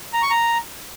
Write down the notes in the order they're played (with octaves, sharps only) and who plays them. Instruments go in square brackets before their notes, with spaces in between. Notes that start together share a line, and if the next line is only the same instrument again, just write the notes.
[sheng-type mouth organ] A#5
C#6
A#5